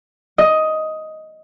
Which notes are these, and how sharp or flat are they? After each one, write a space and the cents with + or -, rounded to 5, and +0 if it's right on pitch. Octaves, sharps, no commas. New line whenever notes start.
D#5 +10